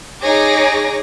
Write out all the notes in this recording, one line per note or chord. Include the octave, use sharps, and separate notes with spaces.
D#4 G#4 C#5 D6 A#6